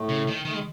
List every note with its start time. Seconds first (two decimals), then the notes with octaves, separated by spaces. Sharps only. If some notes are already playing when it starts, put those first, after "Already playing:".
Already playing: A2 A3
0.09 C#3
0.27 D#3
0.45 D#3 A3
0.53 G#3